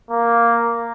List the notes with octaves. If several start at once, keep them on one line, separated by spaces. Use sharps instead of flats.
A#3